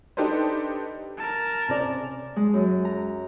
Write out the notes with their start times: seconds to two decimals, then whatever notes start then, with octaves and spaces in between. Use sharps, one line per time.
0.17 D4 D#4 G4 A4 B4 C5
1.17 A#4 A5
1.69 C3 C#4 D5
2.36 G#3
2.54 F#2
2.85 A#5